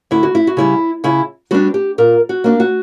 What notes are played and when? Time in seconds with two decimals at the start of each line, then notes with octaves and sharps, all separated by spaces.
0.11 D2 E4
0.23 F#4
0.35 E4
0.47 F#4
0.57 C#3 G3 E4
1.04 C#3 E4
1.51 G3 B3 D4 F#4
1.74 G4
1.98 A#2 A#4
2.29 F#4
2.44 A#3 D4
2.60 F#4